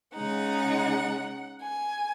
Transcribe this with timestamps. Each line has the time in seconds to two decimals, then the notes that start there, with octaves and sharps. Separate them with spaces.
0.15 C#3 G#3 D#4 F#5
1.61 G#5